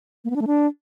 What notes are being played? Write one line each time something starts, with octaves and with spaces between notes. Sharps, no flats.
A#3
B3
D4
A3
D4